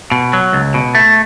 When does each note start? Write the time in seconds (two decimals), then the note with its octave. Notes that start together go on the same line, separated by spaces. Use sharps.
0.12 B2
0.33 F#3
0.53 C#2
0.74 B2
0.95 A3